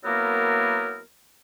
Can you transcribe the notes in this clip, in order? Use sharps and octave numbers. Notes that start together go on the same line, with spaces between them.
F#3 A#3 B3 E4 A#4